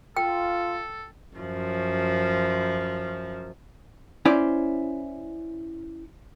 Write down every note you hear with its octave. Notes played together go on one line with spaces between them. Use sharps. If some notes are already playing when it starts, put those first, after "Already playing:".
F4 A4 G5
F#2 F3
C#4 E4 C5 D5